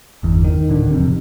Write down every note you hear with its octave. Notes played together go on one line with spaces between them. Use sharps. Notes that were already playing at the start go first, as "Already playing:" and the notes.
G1 E2
D#3
D1 D3 D#3
F2 C3